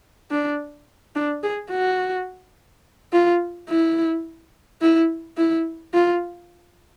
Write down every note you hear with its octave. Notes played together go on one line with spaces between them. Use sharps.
D4
D4
G#4
F#4
F4
E4
E4
E4
F4